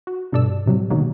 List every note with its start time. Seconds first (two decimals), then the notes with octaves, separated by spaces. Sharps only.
0.07 F#4
0.32 G2 B2 A4 D5 E6
0.66 A2 C3 F#3 G3
0.90 B2 D3 D#3 F#3 G#3 A#3